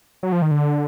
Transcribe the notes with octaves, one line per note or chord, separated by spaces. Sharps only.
F#3
F3
D#3
D3